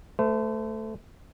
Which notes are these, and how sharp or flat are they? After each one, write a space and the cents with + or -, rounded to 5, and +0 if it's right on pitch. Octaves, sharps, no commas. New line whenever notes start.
A3 +0 C5 -40